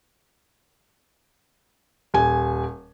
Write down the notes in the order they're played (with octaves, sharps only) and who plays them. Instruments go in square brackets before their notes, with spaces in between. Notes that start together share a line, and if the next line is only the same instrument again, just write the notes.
[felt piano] D#1 G#5